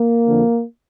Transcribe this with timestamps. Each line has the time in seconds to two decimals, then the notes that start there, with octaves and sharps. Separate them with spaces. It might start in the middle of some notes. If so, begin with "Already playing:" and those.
Already playing: A#3
0.27 F2 D3 F3